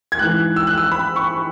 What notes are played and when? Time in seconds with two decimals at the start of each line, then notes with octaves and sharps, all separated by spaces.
0.12 G#6
0.19 G#2 E3 F#6
0.56 E6
0.67 F#6
0.77 E6
0.92 B5
1.16 C#6